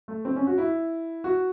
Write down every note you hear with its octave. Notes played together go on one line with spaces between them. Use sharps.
A3
C4
C#4
F#4
E4
F#4